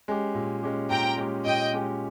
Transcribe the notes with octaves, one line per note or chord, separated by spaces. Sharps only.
G#3 C#4 G4
A#2
G#3 C#4 G4
A#2 G5 A#5
G#3 C#4 G4
A#2 D#5 G5
G#3 C#4 G4